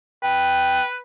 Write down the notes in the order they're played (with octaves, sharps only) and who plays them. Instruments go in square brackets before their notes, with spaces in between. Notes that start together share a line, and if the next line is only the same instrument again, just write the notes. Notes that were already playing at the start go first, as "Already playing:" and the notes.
[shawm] B4 [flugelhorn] G5